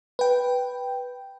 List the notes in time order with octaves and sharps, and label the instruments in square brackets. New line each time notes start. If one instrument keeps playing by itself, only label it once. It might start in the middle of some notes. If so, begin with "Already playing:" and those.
[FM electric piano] B4 G5